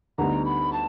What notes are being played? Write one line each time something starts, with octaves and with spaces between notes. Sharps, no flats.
D2 D3 G3 B3 D#4 A#5
B5
A5